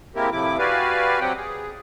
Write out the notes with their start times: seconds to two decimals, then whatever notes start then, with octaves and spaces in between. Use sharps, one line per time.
0.15 G#3 A#3 C4 E4 G4 A#4
0.32 A2 C3 F3 E4 D6
0.59 F#4 G4 B4 D5 F5 G#5
1.20 F#3 C4 G4 F#5 G5
1.37 G#4